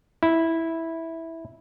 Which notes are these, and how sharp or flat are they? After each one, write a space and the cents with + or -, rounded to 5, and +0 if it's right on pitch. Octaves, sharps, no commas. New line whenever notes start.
E4 -10